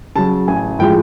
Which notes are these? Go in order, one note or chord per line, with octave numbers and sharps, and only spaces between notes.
C#3 F#3 A5
A1 G#5
A2 F3 G#3 G5